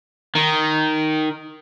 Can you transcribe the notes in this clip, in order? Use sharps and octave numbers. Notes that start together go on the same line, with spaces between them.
D#3